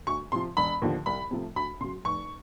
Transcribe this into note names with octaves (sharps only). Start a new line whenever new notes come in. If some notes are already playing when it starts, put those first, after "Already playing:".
D2 C#6
C3 F3 C6
E1 B5
D#2 D3 F3
C2 B5
C3 F3 A3
D2 B5
C#3 F#3 C6
F1 C#6